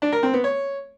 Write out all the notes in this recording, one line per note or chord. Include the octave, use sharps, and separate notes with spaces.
D4
A#4
C4
B3
C#5